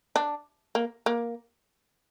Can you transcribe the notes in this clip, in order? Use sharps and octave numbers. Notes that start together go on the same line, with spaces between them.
D4
A#3
A#3